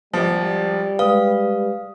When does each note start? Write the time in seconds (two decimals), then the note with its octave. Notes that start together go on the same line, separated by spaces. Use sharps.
0.14 G#1 F3 G3
0.99 G#3 B4 F5 D#6